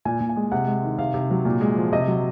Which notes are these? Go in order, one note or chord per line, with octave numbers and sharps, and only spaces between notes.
A#2 G#5
A#2
G#5
G#3
C3 F#5
G#3
D#3
C3 F5
C3
F#3
A#2
G#3
F3
C3 D#5
F#3